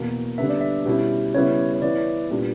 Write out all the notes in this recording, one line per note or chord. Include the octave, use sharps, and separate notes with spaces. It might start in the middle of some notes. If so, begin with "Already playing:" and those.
Already playing: E2 B2 A#3
D3 G3 B3 D4 E5
D5
E5
B2 G3 C#4 E4
C#3 G3 B3 E4 C#5
C#5
E3 B3 E4 D5
A#2 G3 B3 D4